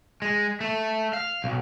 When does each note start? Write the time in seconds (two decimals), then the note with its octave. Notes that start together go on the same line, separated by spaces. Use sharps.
0.22 G#3
0.61 A3
1.13 F5
1.44 B1